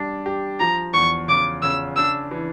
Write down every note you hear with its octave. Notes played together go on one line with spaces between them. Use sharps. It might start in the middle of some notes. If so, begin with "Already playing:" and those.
Already playing: G3 D4 G4
G4
F3 A#5
E2 C#6
C#3 D6
C#3 E6
D4 E6
E3